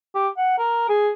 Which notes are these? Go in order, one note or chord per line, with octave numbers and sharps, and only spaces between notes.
G4
F#5
A#4
G#4